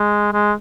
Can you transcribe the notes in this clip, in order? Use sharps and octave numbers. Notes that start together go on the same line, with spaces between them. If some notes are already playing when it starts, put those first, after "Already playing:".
Already playing: G#3
G#3